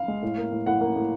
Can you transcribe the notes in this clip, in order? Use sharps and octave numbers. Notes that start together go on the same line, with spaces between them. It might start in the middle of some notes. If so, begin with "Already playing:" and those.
Already playing: F5
G#3
A2
A#3
A2
A2 F#5
A#3
A2